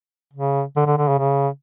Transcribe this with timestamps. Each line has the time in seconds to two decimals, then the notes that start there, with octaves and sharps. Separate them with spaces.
0.33 C#3
0.76 D3
0.87 D3
0.98 D3
1.08 C#3
1.18 C#3